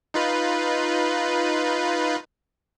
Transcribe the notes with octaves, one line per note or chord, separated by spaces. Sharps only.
D#4 F4 B4